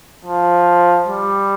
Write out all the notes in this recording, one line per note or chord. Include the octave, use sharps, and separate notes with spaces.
F3
G3